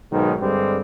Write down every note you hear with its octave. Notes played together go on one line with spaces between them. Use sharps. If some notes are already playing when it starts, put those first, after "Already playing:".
B1 G#2 B2 D#3
G2 D3 G3 G#3 C4